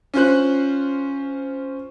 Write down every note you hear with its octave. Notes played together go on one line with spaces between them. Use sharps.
C#4 F4 C5 F#6